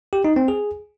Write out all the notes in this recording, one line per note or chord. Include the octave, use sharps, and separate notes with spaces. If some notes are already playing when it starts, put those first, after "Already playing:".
G4
D#4
C4
G#4